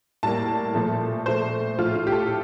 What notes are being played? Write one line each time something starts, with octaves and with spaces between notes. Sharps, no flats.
A2 G3 A#3 A5
A#2 F3 A3
A#2 A3 C5
A2 F3 A3 F4
F4
G4
A4